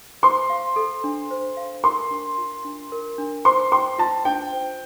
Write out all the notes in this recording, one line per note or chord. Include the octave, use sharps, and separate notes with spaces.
C5 C6
F5
A4
D4
C5
F5
A#4 C6
D4
F4
D4
A#4
D4
C5 C6
G5 C6
F4 A5
D4 G5
C5